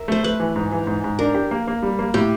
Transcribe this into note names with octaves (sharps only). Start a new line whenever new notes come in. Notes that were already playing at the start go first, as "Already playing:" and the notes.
Already playing: A#4 E5
A3 C5
A3 B4
E3
G#2
E3
G#2
G#2
D4 A#4
G4
A#3
A#3
G3
A#3
A2 G4